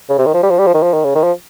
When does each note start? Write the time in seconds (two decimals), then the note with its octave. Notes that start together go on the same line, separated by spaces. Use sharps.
0.09 C#3
0.18 C3
0.26 D#3
0.34 F3
0.43 G3
0.50 F3
0.59 G3
0.67 F3
0.74 D#3
0.83 F3
0.93 D#3
1.05 C#3
1.15 D#3
1.23 F3